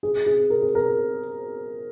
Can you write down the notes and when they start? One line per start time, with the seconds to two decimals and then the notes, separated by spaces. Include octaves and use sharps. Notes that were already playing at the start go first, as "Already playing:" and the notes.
0.03 G#4
0.26 G#4
0.50 A#4
0.62 G#4
0.75 A#4